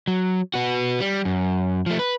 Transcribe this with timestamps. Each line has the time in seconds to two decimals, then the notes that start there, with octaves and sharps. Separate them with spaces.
0.08 F#3
0.54 B3 F#4
1.00 G3
1.25 F#2
1.86 F3 A3
1.99 B4